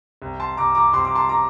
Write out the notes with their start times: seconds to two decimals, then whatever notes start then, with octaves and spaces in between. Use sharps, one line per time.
0.22 C2
0.40 A5 C6
0.57 C2 A#5 D6
0.75 A#5 D6
0.93 C2 C6
1.05 D6
1.15 A5 C6
1.29 A#5 D6